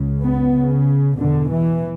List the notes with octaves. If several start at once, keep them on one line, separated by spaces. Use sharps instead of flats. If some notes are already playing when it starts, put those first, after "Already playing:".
Already playing: C#2 C#3
B3
C#3
E2 B2 D3
E3